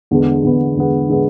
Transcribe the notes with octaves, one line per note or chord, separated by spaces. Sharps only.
E2 D3 G#3 B3
E2 D3 G#3 B3
E2 D3 G#3 B3
D3 G#3 B3